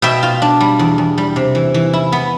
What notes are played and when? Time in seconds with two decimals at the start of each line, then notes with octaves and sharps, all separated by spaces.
0.02 B2 E5 G5
0.23 F4
0.42 D4
0.61 G3
0.79 E2
0.98 E2
1.18 G3
1.36 C3
1.55 E3
1.74 E3
1.93 E4
2.12 B3